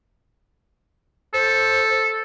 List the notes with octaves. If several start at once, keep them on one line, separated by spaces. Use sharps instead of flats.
A4 C5